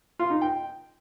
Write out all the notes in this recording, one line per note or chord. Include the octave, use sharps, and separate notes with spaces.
F4
D#4
G5